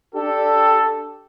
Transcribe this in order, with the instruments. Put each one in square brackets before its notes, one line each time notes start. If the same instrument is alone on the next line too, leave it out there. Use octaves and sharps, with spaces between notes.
[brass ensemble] D4 G4 A4